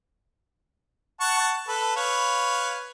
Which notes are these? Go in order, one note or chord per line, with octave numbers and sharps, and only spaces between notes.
F#5 A5 C#6
A4 B4
B4 C#5 F5